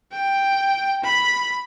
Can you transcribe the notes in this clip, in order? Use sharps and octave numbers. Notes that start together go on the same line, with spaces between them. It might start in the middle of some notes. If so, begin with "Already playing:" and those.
G5
B5